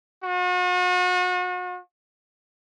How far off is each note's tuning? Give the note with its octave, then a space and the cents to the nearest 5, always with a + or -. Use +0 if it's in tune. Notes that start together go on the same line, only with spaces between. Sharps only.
F#4 -40